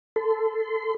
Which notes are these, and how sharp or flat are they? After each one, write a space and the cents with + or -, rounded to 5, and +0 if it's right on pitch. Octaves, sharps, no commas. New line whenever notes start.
A4 +0 C6 -35